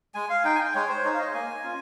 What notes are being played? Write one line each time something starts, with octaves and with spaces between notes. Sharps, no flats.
G#3 G#5
F5
D#4 G5
G#5
G5
G#3 C#5
C5
D#4 C#5
F5
D#5
A#3 G#5
C#4 F4